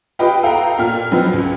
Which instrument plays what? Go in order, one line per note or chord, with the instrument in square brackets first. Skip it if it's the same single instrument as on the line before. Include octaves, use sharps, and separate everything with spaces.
[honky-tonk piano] F4 G4 B4 D#5 G5 B5
A4 F5 G5 A#5
A#2 F6
F3 F#3 C4 D#4 B4
C#2